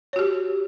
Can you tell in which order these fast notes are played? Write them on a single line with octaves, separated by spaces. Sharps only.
C#5 F#4 G4